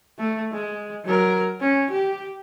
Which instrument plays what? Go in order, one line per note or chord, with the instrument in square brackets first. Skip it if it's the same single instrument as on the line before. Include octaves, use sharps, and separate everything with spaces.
[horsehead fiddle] A3
G#3
F#3 A#4
C#4
G4